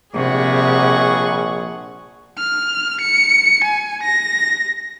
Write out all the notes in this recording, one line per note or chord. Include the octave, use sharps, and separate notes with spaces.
A#1 C3 G3 G#4 F#5 C#6
F6
C#7
G#5
A#6